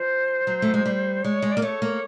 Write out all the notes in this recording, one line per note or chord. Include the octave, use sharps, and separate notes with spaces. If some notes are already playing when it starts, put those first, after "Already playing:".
Already playing: F3 C5
F#3
A3
G#3
G3
G#3 C#5
G#3
D5
A#3
A3 C#5
A#3